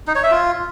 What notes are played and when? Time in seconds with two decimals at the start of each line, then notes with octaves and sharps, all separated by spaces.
0.08 D#4
0.16 C#5
0.23 E5
0.31 F4